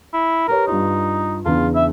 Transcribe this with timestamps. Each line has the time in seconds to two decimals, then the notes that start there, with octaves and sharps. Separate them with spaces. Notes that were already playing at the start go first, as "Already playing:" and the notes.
0.13 E4
0.48 G4 A#4 B4 C#5
0.67 G2 D#4 F4
1.46 E2 C#3 D4 F4
1.75 E5